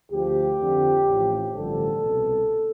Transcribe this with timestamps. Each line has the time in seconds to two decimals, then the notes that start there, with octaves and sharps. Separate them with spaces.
0.11 D2 D3 F3 G4
0.59 F2 D3 F3
1.07 A1 A2 F3
1.53 A1 G2 D3 F3 A4
2.01 C2 B2